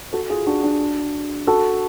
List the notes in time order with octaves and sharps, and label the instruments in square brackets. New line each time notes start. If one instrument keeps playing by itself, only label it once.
[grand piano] F#4 A4
F4 G#4
D4 F#4
D4 F#4
F#4 A4